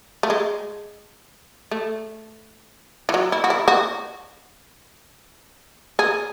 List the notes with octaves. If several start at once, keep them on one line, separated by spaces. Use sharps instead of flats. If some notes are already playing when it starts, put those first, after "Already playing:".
A3
G#3
A3
E3
F#3
E4
F#4
E4
F#4
G#4